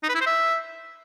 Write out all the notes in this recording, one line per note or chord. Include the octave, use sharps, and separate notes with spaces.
D#4
B4
E4
C5
E5